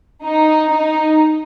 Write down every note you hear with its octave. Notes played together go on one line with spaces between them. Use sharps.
D#4
D#4